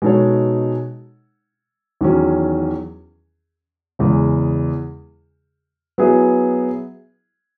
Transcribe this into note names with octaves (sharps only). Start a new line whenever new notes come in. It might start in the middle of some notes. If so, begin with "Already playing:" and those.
B2 G#3 D#4 A4 C#5
E2 D#3 F#3 C#4
E2 C#3 G#3
F#3 B3 E4 G#4